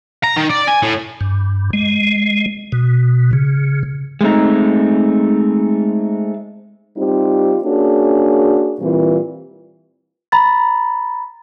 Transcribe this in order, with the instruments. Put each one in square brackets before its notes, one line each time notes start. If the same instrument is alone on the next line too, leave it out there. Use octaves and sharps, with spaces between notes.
[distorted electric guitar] A#5
D#3
D5
G#5
A2
[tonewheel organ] G2
G#3
B2
C#3
[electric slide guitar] G#3 A3 C4 D#4
[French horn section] G3 C4 D#4 F4 G4
A#3 C#4 D4 F#4 G#4
A#2 E3 G3 C4 F4
[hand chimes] A#5 B5 A6